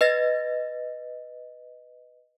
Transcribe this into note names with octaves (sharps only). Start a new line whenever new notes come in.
B4 D#5 A6 A#6